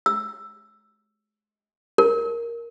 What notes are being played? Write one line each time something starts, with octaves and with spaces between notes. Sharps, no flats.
E6
A#4